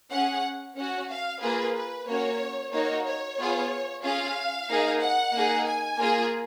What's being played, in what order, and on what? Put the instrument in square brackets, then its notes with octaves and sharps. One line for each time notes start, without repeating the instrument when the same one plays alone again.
[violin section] C#4 G#4 F#5
C#4 F#4 F#5
F5
A#3 F4 G#4 B4
B4
A#3 C#4 F#4 C#5
A#3 D#4 F#4 C#5
C#5
B3 F4 G#4
C#4 F4 G#4 F5
A#3 D#4 G#4
F#5
A#3 D#4 G#4
G#5
A#3 F4 G#4